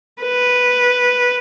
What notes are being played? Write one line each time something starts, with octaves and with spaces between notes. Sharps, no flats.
B4